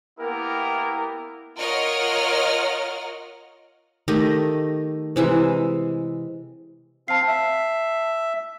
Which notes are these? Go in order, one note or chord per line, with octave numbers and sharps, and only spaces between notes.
A#3 B3 E4 G4 A#4
F4 A#4 C#5 D#5 F#5 F6
D#3 A3 G4 D#5
C3 E3 G#3 E5
C4 F5 A5 C7
E5